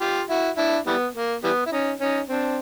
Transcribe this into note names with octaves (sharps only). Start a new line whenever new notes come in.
F4 G4
E4 F#4
D4 E4
E3 G3 B3
A#3
E3 G3 B3
E4
C#4 D#4
C#4 D#4
C4 D4